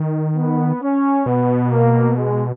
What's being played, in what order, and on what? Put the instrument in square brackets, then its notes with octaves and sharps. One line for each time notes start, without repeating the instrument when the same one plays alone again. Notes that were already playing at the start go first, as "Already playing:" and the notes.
Already playing: [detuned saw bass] D#3
[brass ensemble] B3
C#4
[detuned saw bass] B2 [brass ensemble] B3
[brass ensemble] A#3
G#3